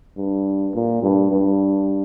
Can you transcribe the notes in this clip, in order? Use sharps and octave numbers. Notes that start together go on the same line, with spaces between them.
G2
A#2
G2
G2